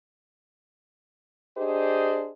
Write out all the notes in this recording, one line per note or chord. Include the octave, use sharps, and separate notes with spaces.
D4 G4 G#4 C5 D#5